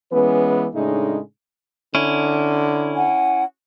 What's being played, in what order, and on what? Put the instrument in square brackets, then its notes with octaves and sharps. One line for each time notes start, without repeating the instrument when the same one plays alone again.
[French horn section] E3 G#3 B3 C#4 B4
A2 C#3 G#3 A3 D4 D#4
[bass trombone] D3 [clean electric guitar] C#4 E4
[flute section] F#5 G#5